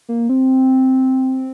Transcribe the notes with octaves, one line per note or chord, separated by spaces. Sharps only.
A#3
C4